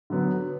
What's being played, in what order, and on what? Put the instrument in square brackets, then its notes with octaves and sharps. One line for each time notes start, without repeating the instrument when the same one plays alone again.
[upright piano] D3 F#3 B3